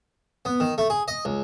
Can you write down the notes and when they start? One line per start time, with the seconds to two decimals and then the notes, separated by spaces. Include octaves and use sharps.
0.45 B3
0.60 D#3
0.78 A3
0.90 G#4
1.08 D#5
1.25 C#2